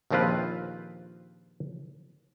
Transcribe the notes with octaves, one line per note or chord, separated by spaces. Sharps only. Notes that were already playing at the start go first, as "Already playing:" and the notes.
A#1 D#2 F3 C4 F4 B4